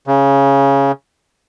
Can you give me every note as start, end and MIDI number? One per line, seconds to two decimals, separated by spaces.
0.07 0.92 49